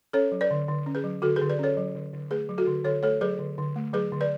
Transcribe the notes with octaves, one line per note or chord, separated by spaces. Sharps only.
C#4 A4 C#5
F#3
B4 D5
D3
D3
C#4
G#4 B4
F#3
D3 F#4 A4
G#4 B4
D3
B4 D5
C#4 A4 C#5
F#3
D3
D3
A3 G#4 B4
F#3
F#4 A4
D3
D3 A4 C#5
A3 A4 C#5
F#3 G#4 B4
D3
D3
A3
F#3 G#4 B4
D3
B4 D5